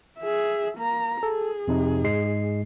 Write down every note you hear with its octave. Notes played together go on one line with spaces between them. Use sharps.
G#4 E5
A#3 A#5
G#4 A4
F2 C3 D#4
G#2 G#3 C7